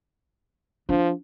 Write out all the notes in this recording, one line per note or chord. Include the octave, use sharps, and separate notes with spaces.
F3 D4